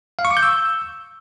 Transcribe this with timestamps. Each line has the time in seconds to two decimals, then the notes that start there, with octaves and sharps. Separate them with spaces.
0.19 F5
0.25 C#6
0.31 D6
0.37 G6
0.43 E6